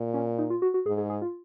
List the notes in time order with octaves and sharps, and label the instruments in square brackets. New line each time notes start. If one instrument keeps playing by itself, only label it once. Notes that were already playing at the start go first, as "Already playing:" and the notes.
Already playing: [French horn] A#2
[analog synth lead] C#4
D#4
F4
F#4
F#4
[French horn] G#2 [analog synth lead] G#4
[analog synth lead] G#4
G#4
F4